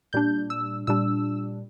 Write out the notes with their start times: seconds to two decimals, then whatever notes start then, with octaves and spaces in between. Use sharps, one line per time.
0.13 A#2 G3 D4 G6
0.50 E6
0.87 A#2 G3 D4 E6